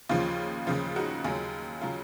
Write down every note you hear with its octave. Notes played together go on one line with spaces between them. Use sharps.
D#2 C#3 F3 F4
D#2 C#3 F3 F4
D#4 F#4
D#2 C#3 F#3 F4 G#4
C#3 F#3 F4